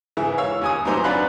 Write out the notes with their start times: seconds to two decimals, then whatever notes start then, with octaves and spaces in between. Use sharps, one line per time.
0.17 G#2 C#3 E3 E4
0.38 C#5 F5 E6
0.61 D#2 G#5 D#6
0.85 A2 E3 F#3 D#4 C5 D6
1.04 F#2 D4 B4 F5 B5 F#6